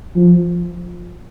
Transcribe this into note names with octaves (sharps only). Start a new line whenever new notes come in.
F3